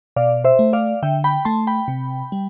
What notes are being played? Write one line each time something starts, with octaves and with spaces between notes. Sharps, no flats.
B2 D5 F5
C5 E5
A3
D5 F5
D3 E5 G5
G5 B5
A3 A5 C6
G5 B5
C3
G3